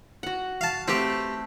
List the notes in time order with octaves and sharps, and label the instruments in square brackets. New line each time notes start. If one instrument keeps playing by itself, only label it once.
[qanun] F#4 F#5
[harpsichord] F5 A5
[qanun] A3 B4 E5 [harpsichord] C4 G4